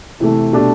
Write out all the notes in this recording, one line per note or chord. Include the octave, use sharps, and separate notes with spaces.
C3 E3 A3
B2 A3 D4 G4